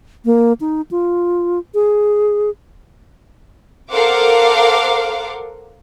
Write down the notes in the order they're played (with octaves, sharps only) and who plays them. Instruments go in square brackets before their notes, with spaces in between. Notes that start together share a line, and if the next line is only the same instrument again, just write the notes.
[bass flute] A#3
D#4
F4
G#4
[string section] A4 A#4 C5 F5 F#5 D6